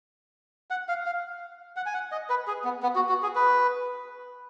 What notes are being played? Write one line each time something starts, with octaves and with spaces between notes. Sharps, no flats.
F#5
F5
F5
F#5
G#5
F#5
D#5
B4
G#4
B3
B3
F#4
F#4
G#4
B4